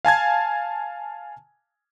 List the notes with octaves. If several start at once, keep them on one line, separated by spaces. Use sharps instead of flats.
F5 G#5 A5 G#6